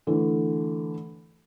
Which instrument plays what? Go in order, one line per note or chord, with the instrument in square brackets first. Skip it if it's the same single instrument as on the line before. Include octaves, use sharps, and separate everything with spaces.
[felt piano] D3 E3 A3